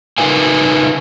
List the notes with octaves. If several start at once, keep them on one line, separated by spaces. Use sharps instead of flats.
C#3 D#4 A#4 B4 F5 G#5